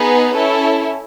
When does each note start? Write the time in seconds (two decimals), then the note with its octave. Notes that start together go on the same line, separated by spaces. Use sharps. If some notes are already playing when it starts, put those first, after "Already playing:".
Already playing: B3 D#4 G#4 B4
0.35 C#4 E4 A4